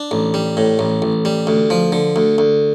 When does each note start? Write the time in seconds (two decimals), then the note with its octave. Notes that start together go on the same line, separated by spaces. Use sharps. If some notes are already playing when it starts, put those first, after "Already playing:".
Already playing: D4
0.11 A1
0.34 G3
0.57 A2
0.79 A1
1.02 A1
1.25 G3
1.47 D2
1.70 F3
1.92 D3
2.16 D2
2.38 D2